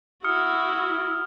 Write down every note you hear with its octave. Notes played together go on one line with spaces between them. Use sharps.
E4 F#4 D#6 F6 C#7